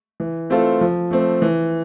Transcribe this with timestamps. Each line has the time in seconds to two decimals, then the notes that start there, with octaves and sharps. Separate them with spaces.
0.20 E3
0.50 A3 C4 F4 A4
0.81 F3
1.11 A3 C4
1.42 E3